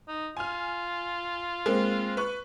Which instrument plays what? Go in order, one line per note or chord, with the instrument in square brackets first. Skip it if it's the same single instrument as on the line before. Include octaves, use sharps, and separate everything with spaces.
[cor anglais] D#4
[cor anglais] F4 [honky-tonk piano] G#5 F6
[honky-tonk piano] G#3 A#3 C4
B4 C#6 F#6